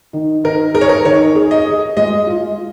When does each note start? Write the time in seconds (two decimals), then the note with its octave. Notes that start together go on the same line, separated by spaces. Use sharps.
0.13 D#3
0.44 D#3 A#4
0.74 G#4 A#4
0.81 C#5
0.89 A#4
1.05 D#3 C#5
1.35 G#4
1.51 D#5
1.66 G#4
1.97 G#3 D#5
2.27 F4